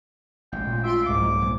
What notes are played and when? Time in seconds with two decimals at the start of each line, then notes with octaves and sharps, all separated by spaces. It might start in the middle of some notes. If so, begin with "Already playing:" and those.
0.52 A1 G#3 G5
0.67 A#2
0.84 F4 E5 C6 D7
1.06 C2 G#2 D6
1.20 A2 F#3 G3
1.41 A#2 F#3